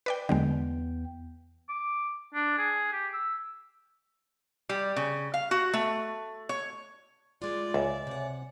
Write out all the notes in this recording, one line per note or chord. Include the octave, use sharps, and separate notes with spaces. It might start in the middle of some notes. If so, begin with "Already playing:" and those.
B4 D5 G5
E2 D3 F#3 G#3 B3 G5
D6
D4
G#4
G4
E6
G3
C#3
F5
F#4
A3
C#5
A2 G#3 F4 D5
C#2 C#5 E5 G#5
C3 F#5